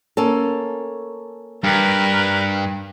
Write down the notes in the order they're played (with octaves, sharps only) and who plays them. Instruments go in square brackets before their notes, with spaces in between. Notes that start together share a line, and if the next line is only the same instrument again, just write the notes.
[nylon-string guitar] A#3 C#4 A4
[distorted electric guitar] G2 [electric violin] A#4 B4